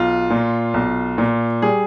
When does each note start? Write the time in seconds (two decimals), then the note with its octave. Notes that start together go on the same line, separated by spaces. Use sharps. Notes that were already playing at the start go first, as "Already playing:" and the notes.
Already playing: B1 F4
0.30 A#2
0.74 B1
1.18 A#2
1.62 G3 G#4